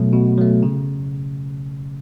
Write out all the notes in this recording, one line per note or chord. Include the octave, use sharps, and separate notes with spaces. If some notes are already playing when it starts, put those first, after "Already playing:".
Already playing: B2 F#3 A3
B2
F#3 A3
C#3